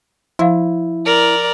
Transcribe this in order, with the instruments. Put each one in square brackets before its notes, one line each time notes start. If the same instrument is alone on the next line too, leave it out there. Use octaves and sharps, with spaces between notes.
[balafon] F3 F5 [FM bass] E4
[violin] A#4 D5